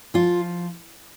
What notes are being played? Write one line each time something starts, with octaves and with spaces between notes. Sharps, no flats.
F3 F4